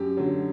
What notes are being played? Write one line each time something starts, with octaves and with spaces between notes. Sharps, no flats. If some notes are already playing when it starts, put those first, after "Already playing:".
Already playing: F#2 G4
D3 F#3